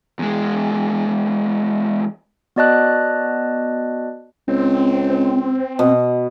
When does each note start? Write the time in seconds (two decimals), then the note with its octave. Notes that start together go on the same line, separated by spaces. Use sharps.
0.19 E2 G#3
2.56 B3 F#4 D5 D#5 A5 F#6
4.48 C#2 C4
5.79 B2